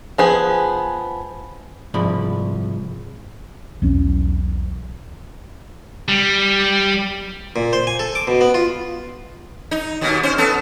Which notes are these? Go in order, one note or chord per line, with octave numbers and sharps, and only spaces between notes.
F3 B3 G#4
C2 G#2 F3 B5
B1 E2 C#4
G3
A#2
C5
G#5
A4
D6
B2
B3
F4
D#4
D#2 B2
C#4 C5
B3 A4